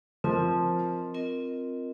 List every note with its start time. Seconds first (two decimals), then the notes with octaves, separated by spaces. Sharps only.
0.24 F3 C4 F4 A#4 D#5
1.14 C4 F4 A#4 D#5